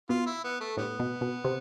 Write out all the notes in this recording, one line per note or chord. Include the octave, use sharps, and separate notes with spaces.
B2 F4
E4
B3
A3
A2 D3 G3 B3
B2
B2
C3